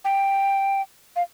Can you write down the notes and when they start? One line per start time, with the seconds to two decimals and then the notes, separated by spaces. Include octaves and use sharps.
0.05 G5
1.16 F5